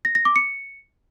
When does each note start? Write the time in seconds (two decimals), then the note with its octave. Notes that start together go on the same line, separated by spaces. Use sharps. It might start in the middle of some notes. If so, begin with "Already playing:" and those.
0.05 A#6
0.15 A#6
0.25 D6
0.36 C#7